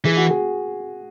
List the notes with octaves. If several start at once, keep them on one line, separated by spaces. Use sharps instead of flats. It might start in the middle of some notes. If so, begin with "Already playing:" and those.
E3 G#4
F#4
G#4